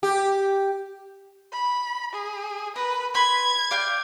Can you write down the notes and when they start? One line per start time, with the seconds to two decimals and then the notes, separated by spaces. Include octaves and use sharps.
0.03 G4
1.53 B5
2.13 G#4
2.76 A#4 B4
3.15 B4 B5 C6 G#6
3.71 D5 F5 G5